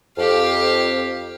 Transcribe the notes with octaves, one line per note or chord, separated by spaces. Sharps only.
F2 G4 F5